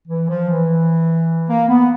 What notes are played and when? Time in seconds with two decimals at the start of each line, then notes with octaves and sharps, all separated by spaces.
0.08 E3
0.29 F3
0.49 E3
1.49 A#3
1.69 B3